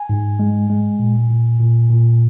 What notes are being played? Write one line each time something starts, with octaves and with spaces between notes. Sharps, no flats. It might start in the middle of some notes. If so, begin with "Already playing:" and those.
Already playing: G#5
G#2
G#3
G#3
A#2
A#2
A#2
A#2